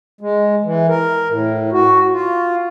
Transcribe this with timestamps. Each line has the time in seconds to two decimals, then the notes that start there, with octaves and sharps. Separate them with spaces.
0.21 G#3
0.64 E3
0.89 A#4
1.29 A2
1.72 F#4
2.12 F4